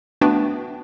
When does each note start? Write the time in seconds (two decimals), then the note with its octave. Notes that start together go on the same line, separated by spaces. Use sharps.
0.21 A3 B3 D4 F#4 B4 G5